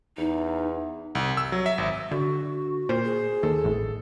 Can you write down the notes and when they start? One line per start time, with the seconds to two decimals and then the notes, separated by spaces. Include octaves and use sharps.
0.18 E2 D#4
1.15 C2
1.37 E6
1.52 F#3
1.66 E5
1.78 G#1
2.11 D3 F#4
2.89 A#2 C5
3.04 G#4
3.43 D#2 A4
3.64 A1